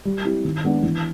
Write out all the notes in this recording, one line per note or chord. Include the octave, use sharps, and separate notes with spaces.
G3
C4 E4 G4
D#3
G#3 B3 D4
E3